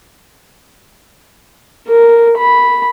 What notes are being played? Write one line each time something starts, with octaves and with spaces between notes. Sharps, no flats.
A#4
B5